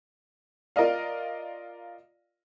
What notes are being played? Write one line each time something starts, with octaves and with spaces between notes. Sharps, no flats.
F4 A#4 D5 D#5 F5